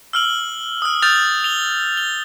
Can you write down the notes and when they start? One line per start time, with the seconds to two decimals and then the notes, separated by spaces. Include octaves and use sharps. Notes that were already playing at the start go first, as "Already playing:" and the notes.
0.13 E6 F6 F#7
0.82 D#6 F6
1.02 D#6 F6 G6 A6 F7
1.44 F7 G7
1.97 G7